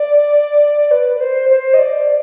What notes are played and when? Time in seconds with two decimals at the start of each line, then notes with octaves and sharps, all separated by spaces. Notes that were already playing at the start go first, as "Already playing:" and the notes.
Already playing: D5
0.91 B4
1.16 B4
1.20 C5
1.49 C5
1.73 D#5
1.79 D5